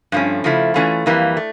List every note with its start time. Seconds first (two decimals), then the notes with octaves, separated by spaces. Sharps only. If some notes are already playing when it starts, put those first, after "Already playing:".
0.12 G2 F3 A3 C#4
0.44 C#3 F3 A3 E4
0.74 E3 A3 C#4 F4
1.06 F2 E3 G3 A#3
1.37 A3